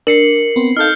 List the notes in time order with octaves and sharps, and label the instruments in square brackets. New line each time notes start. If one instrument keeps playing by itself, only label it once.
[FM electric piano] D4 [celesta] A#4 [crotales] C7 C#7 F#7
[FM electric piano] B3 C4
[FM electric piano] D#4 A4 F5 [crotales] F6 G6